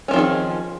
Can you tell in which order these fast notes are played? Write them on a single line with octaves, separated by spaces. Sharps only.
C#4 C4 F3 D#3 G#4